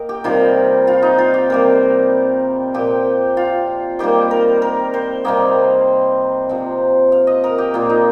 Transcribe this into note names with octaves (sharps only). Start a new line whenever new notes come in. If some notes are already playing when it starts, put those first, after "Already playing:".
Already playing: A#3 A#4 D#5 G5
G4
C3 D#3 G3 F4
F4
D#4
F4
G4
C3 G3 A#3 A#4
A#2 F3 C4 G4
F4
D#3 G3 A#3 G4
A#4
A#4
C5
C3 G3 A#3 D#5
C3 F3 C4
F5
D#5
A#4
G4
A#2 A#3 F4
D#4